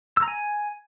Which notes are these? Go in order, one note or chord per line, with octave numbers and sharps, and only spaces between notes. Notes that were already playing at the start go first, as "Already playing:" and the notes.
E6
A#5
G#5